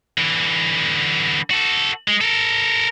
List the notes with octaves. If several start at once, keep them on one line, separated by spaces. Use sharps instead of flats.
D3 E3
F#4 A4
G#3
A4 A#4